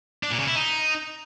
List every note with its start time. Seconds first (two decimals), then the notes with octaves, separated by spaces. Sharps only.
0.23 D4
0.31 A#2
0.39 C#3
0.47 E4
0.55 D#4